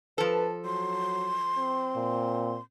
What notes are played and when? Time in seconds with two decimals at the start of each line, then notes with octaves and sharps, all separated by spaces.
0.18 F3 A4 B4
0.65 F#3 C6
1.58 C4
1.96 A#2